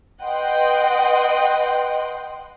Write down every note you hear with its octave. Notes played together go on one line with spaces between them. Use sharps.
B4 D#5 F#5 G5 C6